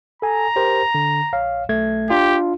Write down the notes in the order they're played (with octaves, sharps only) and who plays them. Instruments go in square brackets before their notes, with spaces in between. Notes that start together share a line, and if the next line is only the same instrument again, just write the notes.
[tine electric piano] A4 G#5 [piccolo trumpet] A#5
[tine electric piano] G4 A#4 C5
D3
A#1 C#5 F5
B1 A3 G#6
[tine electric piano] D4 F4 [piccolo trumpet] G4